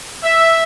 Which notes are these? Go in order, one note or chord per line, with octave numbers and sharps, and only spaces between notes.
E5